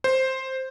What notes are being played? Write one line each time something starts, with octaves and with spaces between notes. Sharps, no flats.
C5